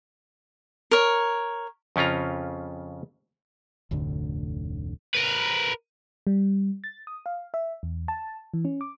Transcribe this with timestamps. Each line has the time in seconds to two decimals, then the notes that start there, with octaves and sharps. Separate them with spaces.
0.91 A#4 C#5
1.96 F2 C#3 C#4 F4 A#5
3.91 F1 D2 A2 D3
5.15 A#4 B4
6.27 G3
6.84 A6
7.07 D#6
7.26 F5
7.54 E5
7.83 E2
8.08 A5
8.54 E3
8.65 C#4
8.81 D6